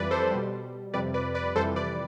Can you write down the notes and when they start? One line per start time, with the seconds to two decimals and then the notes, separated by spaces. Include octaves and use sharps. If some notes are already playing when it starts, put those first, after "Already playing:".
Already playing: F2 E3 G3 B4 D5
0.11 A4 C5
0.31 B2 G3
0.94 F2 C3 G3 B4 D5
1.14 B4 D5
1.34 B4 D5
1.56 F2 C3 E3 G3 A4 C5
1.76 B4 D5